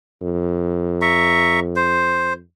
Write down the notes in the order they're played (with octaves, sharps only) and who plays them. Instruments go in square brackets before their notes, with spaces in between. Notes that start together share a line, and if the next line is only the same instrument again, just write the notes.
[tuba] F2
[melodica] E5 A#5 C#6
C5